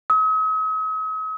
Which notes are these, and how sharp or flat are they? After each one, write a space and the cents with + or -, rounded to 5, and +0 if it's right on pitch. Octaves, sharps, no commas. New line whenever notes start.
D#6 +45